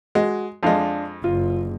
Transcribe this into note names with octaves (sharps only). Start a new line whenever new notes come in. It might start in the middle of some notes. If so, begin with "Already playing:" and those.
G#3 F#4
F2 G#3 D4 F5 A5
F#1 F4